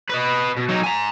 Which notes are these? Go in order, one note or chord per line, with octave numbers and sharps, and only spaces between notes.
B4 D#5
B2
F#3 D#4
G#5 A#5